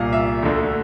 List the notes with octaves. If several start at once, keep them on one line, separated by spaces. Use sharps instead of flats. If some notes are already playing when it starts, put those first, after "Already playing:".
Already playing: C2 A#2 F5
E5
D2 D3